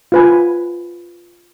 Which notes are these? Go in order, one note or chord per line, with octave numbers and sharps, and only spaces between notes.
F4 B4 G#5